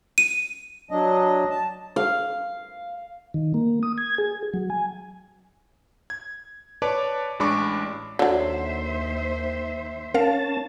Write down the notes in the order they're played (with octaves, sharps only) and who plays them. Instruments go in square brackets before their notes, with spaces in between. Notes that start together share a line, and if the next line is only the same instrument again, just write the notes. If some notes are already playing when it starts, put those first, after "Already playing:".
[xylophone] D#7
[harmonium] F#3 D4 D#5
A5
[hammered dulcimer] F5
[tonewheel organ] D#3
A#3
D#6
G#6
G#4
F#3
G#5
[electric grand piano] G#6
B4 C#5 D5 A5 D6
A1 G#3 D4 B5 C#6 D6
[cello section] D#2 C5 E5 [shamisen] D3 F#3
[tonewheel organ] C#4 A5 [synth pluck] A#4 F5